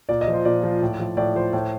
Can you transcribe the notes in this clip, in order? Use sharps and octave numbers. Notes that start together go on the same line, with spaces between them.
A#2 D5
D#5
F3
C5
A#2 D5
F3
A2
F3
A2 D5
F3 C5
A2